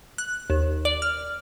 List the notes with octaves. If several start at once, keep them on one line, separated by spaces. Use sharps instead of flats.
F#6
D#2
D5
F6